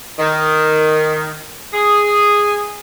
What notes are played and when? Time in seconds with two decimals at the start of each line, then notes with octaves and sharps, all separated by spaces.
0.19 D#3
1.74 G#4